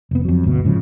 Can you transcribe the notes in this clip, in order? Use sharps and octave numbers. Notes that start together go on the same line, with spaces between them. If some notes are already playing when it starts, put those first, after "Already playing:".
F1 B3
F2 F#3
G1 D2 B2
G#2 C#3 F3